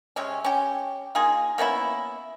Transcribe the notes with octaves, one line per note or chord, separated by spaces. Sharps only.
C3 G#3 C#4
C#4 G4
A#3 D#4 F4 G#4
A#3 B3 C#4 E4